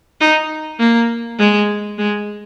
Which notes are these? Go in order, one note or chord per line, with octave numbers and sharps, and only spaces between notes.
D#4
A#3
G#3
G#3